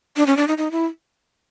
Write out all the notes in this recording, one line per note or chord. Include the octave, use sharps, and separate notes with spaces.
D4
C#4
D4
D#4
D#4
E4